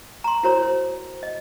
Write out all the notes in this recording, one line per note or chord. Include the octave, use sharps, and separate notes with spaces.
A#5 C6
E4 F#4 A#4 C5 C#5 A#5
C5
D#5